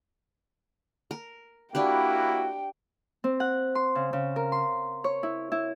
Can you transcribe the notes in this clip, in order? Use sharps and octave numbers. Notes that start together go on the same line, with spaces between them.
A#4
A#3 D4 E4 F#4 G4 B4 G5
C4
F#5
C6
C#3
C#3
A#4
C6
C#5
E4
E4